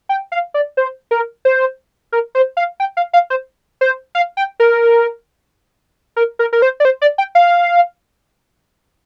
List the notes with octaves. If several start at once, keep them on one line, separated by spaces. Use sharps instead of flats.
G5
F5
D5
C5
A#4
C5
A#4
C5
F5
G5
F5
F5
C5
C5
F5
G5
A#4
A#4
A#4
A#4
C5
D5
C5
D5
G5
F5